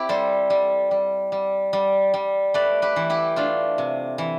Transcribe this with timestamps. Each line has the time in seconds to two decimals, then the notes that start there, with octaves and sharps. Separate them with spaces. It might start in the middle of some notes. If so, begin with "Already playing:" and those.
Already playing: C4 E4 G4
0.09 G3 A4 C5
0.50 G3
0.91 G3
1.32 G3
1.73 G3
2.14 G3
2.54 A3 B4 D5
2.82 G4 B4
2.96 E3
3.10 E4 G4
3.36 A3 D4 F4
3.78 C3
4.18 E3